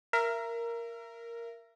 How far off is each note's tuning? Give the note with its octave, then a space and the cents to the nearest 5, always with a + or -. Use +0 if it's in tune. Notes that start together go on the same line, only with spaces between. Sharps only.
A#4 +0 E5 +35